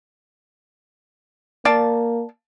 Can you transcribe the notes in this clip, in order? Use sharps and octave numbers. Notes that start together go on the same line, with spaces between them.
A#3 D5 F5 A5